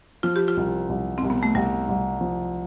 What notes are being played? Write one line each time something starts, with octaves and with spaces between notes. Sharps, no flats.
F3 F4
G4
F4
C2
C2
C2 C4
B3
A3
C2 G3
C2
F3